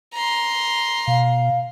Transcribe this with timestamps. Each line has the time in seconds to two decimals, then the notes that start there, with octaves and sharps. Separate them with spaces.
0.14 A#5 C6
1.08 B2 F5